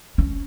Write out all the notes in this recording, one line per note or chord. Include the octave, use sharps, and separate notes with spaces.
C#4